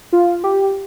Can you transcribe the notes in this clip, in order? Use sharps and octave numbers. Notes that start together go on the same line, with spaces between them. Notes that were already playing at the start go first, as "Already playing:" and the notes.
F4
G4